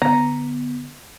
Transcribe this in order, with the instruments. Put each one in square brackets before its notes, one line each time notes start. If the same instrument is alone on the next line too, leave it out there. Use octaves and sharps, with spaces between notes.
[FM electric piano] D3 B3 [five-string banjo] A#5